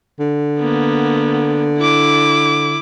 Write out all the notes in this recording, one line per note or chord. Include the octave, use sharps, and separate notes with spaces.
D3
A#3 B3
E4 D6